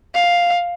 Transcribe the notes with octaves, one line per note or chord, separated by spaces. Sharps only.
F5